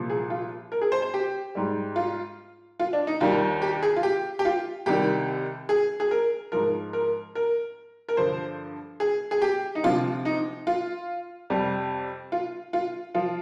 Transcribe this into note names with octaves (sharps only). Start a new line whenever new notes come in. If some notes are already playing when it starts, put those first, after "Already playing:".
Already playing: C2 A#2 F3
G#4
F4
A#4
G#4
C5
C5
G4
G#2 G3
F4
F4
D4
D#4
D#2 D#3 G3 F4
G4
G#4
F4
G4
G4
F4
C2 C3 D#3 G3 G4
G#4
G#4
A#4
G#2 F3 A#4
A#4
A#4
A#4
G2 D3 F3 C5
G#4
G#4
G4
D#4
D2 C3 F3 F4
D#4
F4
F2 C3 G3
F4
F4
F3 F4